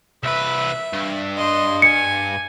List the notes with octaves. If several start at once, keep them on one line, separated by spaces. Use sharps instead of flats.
C2 B4 E5
G2
D#5 C6
G#5 C#7